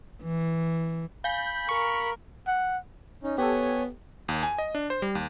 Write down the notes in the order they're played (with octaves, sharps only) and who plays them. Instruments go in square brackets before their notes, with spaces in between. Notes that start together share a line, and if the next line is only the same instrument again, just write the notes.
[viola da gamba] E3
[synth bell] F5 G#5 [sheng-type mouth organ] B5 [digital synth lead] G6
[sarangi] A#4 [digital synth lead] C#6
[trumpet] F#5
[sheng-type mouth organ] C#4 D#4
[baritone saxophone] B3 [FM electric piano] G4 A4 [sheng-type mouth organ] C#5 G#5
[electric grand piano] D#2
G#5
D#5
D4
C5
G3
D#2